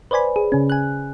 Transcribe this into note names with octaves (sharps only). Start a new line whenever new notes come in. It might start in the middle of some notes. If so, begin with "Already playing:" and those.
B4 C5 D5 G#5 B5
G#4
C#3 C#4
G#5 F#6